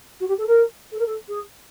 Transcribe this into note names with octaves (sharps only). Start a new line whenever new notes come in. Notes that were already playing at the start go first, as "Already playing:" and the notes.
F#4
G4
A4
A#4
A4
A#4
A4
G#4